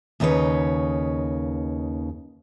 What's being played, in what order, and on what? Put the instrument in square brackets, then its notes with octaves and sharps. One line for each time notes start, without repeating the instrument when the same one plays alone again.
[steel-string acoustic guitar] D#2 C#3 D#4 B4 C#5